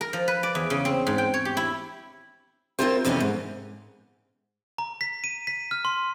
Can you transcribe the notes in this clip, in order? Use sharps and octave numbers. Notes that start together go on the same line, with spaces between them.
A#4
F3
B4
D5
E2
C#3
C4
G#2
G5
C#5
G4
E4
A#3 C4 E4 F4 G4 C5
F2 C3 E3 B3 C#4
G#2
A#5
B6
D#7
B6
F6
C6